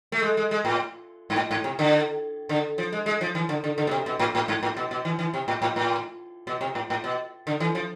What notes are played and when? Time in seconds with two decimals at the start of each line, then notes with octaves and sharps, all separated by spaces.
0.12 A3
0.22 G#3
0.37 G#3
0.51 G#3
0.65 A2
1.30 G#2
1.36 A2
1.51 G#2
1.64 C3
1.79 D3
2.49 D3
2.78 F3
2.92 G#3
3.06 G#3
3.21 F3
3.35 E3
3.49 D3
3.64 D3
3.78 D3
3.87 B2
3.91 C3
4.06 B2
4.19 A2
4.35 A2
4.48 G#2
4.63 A2
4.77 B2
4.91 B2
5.05 E3
5.19 E3
5.34 C3
5.48 A2
5.62 A2
5.76 A2
6.47 B2
6.61 C3
6.75 A2
6.90 A2
7.04 B2
7.47 D3
7.60 E3
7.75 F3